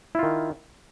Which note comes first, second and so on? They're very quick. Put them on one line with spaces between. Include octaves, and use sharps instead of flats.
E4 F4 D#3